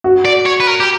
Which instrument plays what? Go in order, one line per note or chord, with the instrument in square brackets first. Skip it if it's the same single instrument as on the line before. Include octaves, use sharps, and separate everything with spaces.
[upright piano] F#4
[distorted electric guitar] D5
C#5
B4
A#4
G4